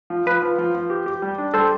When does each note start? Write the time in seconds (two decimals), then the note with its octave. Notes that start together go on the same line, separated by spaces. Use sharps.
0.10 F3
0.26 F3 B4
0.42 F3
0.59 F3
0.75 F3
0.90 G4
1.06 G4
1.22 G3
1.38 D4
1.54 G3 A4 C5